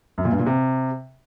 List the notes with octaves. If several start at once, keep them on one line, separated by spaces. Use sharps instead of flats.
F#2
A#2
G2
A#2
C3